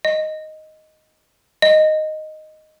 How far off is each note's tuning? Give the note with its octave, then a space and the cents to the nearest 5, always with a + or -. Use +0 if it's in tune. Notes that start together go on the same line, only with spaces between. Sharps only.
D#5 +0
D#5 -5